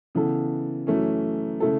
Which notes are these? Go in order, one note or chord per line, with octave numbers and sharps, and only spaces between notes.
C#3 E3 B3 A4
F#2 E3 A3 C#4
C#3 A3 E4 A4